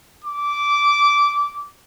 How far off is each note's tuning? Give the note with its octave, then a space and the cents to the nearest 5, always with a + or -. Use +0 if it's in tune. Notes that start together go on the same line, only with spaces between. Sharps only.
D6 -15